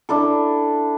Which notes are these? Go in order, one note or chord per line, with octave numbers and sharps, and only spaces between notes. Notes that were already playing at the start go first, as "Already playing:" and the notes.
D4 E4 A4